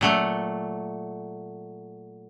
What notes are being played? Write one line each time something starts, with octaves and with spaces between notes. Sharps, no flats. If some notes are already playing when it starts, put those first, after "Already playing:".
A#2 F#3 A3